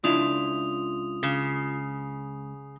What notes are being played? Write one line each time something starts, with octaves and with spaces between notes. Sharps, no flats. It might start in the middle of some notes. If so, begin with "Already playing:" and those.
C#2 D4 E4 F4 D#6 F7
C#3